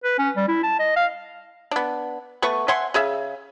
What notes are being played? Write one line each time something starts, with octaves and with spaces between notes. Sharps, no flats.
B4
C#4
G3
E4
A5
D#5
F5
B3 D4
A3 B3 B4 C#6
E5 F#5 G#5 C6
C#3 G#4 E5